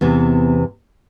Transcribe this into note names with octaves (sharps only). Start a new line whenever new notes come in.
E2 C3 E3 B3